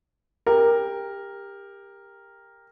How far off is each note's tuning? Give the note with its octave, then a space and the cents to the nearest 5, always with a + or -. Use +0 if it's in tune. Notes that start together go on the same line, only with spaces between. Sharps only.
G4 +20 A#4 +0